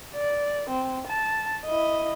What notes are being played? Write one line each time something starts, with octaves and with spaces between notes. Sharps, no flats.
D5
C4
A5
E4 D#5